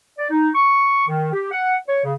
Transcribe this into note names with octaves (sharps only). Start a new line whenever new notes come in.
D5
D#4
C#6
D#3
G4
F#5
C#5
C#3